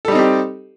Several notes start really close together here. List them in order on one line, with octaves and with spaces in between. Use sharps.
A4 G3 D#4 C4 G4